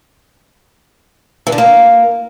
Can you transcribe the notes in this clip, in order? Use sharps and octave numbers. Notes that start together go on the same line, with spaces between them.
E3
D3
A#3